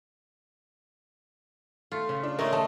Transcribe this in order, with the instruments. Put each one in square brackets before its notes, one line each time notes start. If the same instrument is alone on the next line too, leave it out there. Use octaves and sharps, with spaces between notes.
[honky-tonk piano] A3 [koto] F4
[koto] C#3
[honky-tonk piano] D4
[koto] G#3 A3 [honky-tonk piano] A#4 C#5
[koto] A3 [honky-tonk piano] D#5 A5